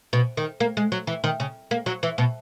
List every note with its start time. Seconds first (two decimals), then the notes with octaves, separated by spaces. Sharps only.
0.13 B2
0.37 D#3
0.60 A#3
0.77 G#3
0.92 F#3
1.07 E3
1.24 D#3
1.40 C#3
1.71 A#3
1.86 F#3
2.03 E3
2.18 B2